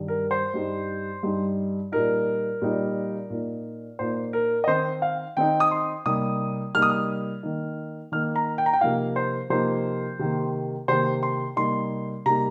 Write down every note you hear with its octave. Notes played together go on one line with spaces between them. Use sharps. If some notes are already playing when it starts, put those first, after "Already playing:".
Already playing: G2 D#3 G3
A#4
C5
G2 G3 D#4
G2 G3 D#4
A#2 G3 D#4 A#4
A#2 G3 D#4
A#2 A#3 D#4
A#2 A#3 D#4 C5
A#4
D#5
D#3 C4 D#4 C5
F5
D#3 C4 D#4 G5
D#6
C6
C3 G3 A#3 D#4 D#6
C3 G3 A#3 D#4 F6
D#6
F6
D#3 A#3 D#4
D#3 A#3 D#4 F6
A#5
G5
A#5
G5
C3 F3 A#3 D#4 F5
C5
C3 F3 A#3 D#4 C5
C3 D#3 A#3
C3 D#3 A#3 C5
C6
C3 G3 A#3 D#4 C6
C3 G3 A#3 D#4 A#5